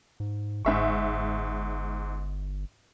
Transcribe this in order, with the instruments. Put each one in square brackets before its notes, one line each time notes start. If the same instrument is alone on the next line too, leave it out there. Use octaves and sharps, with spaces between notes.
[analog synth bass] G#2
[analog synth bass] G1 [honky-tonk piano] G#2 E5 C#6